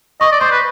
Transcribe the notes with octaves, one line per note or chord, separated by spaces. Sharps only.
D#5 C#6
D5
C5 C6
B4